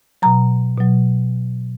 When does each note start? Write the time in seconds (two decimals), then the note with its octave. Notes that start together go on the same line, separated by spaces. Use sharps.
0.22 B2 F#3 A#5
0.78 B2 F#3